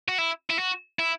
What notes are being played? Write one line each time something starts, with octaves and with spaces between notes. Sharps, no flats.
F#4
E4
E4
F#4
E4